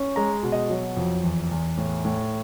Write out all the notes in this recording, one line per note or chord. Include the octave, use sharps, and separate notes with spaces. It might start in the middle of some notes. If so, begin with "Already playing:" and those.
Already playing: C#4
G#3 A#5
B2
D#5
F#3
F2
E2
E2
A2
A2